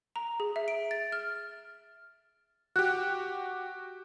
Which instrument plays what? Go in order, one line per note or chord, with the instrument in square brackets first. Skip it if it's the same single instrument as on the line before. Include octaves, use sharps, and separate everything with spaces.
[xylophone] A#5
G#4
E5
D7
A6
F6
[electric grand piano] F#4 G4 [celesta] F#6